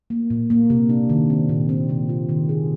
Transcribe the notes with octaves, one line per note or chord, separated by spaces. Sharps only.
A#3
A#2
A#3
C3
D4
D#3
C4
A#2
C4
C3
F4
D#3
G#4